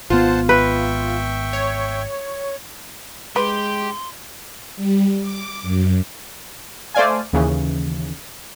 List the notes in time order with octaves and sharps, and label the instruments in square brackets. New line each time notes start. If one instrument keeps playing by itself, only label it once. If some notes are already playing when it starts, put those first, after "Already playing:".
[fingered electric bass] G#1 B3 [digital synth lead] F4 [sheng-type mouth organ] C5 F#5 A5
[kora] B4 [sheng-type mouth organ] E5 G5 C#6
[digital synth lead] C#5
[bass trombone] G#3 [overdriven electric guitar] G4 [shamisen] B4 [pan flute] C6
[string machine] G3
D6
F#2
[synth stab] A3 C5 D5 F5 G#5
D#2 C#3 E3